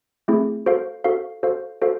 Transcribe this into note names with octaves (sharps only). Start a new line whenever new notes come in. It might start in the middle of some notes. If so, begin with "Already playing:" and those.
A3 C4 E4 G#4
F#4 A4 C5 F5
F#4 A4 C5 F5
F#4 A4 C5 F5
F#4 A4 C5 F5